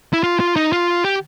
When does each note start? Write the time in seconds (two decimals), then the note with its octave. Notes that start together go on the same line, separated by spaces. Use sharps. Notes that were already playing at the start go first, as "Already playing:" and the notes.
0.13 E4
0.23 F4
0.40 F4
0.56 D#4
0.72 F4
1.05 G4